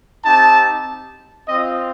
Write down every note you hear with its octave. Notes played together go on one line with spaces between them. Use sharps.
C4 D#4 G4 A5
C4 F4 D#5